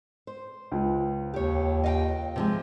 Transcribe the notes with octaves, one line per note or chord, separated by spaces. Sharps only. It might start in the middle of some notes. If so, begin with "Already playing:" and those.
C5
C#2
D#2 G4 C#5
D#5 F5 G5
C3 F3 G#3